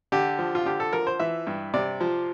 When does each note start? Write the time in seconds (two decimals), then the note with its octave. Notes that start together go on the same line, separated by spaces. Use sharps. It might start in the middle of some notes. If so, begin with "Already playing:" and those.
0.12 D3 G4
0.39 F3
0.55 F4
0.65 D3 G4
0.80 A4
0.93 F3 A#4
1.07 C5
1.20 E3 E5
1.47 G2
1.74 C3 D5
2.01 F3